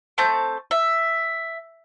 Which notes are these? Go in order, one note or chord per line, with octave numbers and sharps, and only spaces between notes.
A3 C4 A5 G6
E5